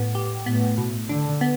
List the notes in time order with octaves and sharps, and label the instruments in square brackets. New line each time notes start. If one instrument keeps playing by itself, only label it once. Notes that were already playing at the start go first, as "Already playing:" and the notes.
Already playing: [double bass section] A2 [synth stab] B3
[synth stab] G4
[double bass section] A2 [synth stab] B3
[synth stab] B2
[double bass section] D3 [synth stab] D4
[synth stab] B3